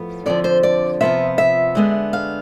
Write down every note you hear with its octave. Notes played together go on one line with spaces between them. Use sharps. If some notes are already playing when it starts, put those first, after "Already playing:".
Already playing: A2 F3 B3
F2 D3 F3 D5
C5
D5
C3 F3 B3 F4 E5
E5
D3 G#3 B3
F5